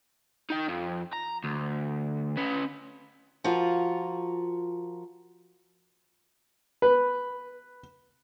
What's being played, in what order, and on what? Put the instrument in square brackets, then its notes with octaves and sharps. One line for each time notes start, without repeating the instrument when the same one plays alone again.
[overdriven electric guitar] D#4 G5
F2
A#5
D2
C#4 B4
[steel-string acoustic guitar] F3 F4 F#4 A#4
[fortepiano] B4